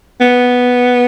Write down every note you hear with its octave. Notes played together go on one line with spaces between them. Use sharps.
B3